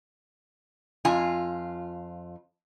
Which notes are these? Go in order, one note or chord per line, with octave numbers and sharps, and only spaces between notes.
F2 F4 G#5